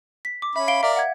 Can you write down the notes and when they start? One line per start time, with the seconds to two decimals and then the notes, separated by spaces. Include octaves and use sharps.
0.25 B6
0.42 D6
0.56 C#4 E5 B5
0.68 F5 D7 G7
0.83 A#4 D5 E5 F5
0.96 F#5 G#6